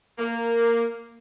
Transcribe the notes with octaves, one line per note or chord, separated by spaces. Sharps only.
A#3